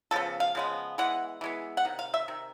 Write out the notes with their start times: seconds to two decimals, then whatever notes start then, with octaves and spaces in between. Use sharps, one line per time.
0.11 C#3 F3 B3 A4
0.40 F5
0.55 C#3 F3 G#3 B3
0.98 E3 G#3 B3 F#5
1.41 E3 G#3 B3
1.77 F#5
1.85 C3 D#3
1.99 F5
2.14 E5
2.28 C3 D#3